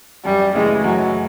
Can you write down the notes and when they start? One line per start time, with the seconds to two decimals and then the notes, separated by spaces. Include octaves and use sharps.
0.25 F#2 G3
0.55 C#3 E3 G#3 A3
0.84 F#2 F#3